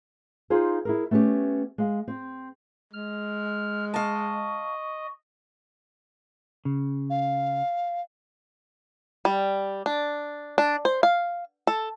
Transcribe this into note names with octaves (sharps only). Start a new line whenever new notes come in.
D#4 F4 G#4 C5
E4 G#4 A#4
A3 B3 C#4 D#4 G4
G#3 F5
C4
G#3 F6
D#5 F5 A5 C#6
C#3
F5
G3
D4
D4
C5
F5
A4